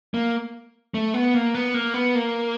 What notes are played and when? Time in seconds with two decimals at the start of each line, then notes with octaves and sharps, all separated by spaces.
0.14 A#3
0.94 A3
1.14 B3
1.34 A#3
1.54 B3
1.74 A#3
1.94 B3
2.15 A#3